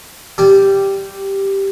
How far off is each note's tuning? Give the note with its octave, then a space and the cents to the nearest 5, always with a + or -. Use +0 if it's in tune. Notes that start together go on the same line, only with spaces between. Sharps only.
G3 -5 G4 +0 G#5 +45